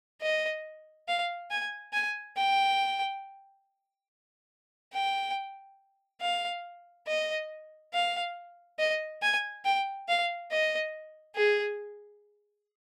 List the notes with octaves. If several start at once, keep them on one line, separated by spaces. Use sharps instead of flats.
D#5
F5
G#5
G#5
G5
G5
F5
D#5
F5
D#5
G#5
G5
F5
D#5
G#4